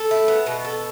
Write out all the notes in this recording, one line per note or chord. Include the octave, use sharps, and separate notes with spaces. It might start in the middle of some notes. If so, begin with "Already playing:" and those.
Already playing: A4
E4
B3
B2
A4